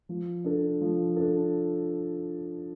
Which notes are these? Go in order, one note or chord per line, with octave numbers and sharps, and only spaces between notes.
F3
D4 A4
F3
D4 A4